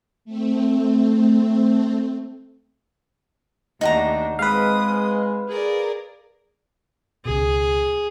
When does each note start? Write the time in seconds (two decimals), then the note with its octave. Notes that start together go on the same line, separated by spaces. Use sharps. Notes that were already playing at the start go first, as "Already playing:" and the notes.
0.25 A3 C4
3.81 D#2 C3 A3 D4 D#4 F#4 A#5
4.39 G#3 C4 B4 F5 D#6
5.48 G#4 A#4 D5
7.25 C#2 B2 G#4